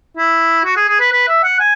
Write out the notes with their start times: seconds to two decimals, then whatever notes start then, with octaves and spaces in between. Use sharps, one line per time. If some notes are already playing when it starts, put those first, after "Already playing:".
0.17 E4
0.65 F#4
0.76 G#4
0.89 G#4
1.00 B4
1.12 B4
1.28 E5
1.44 F#5
1.60 G#5